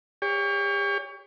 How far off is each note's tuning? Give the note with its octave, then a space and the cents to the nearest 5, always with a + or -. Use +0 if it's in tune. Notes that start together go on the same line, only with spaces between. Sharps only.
G4 +40 C#5 +25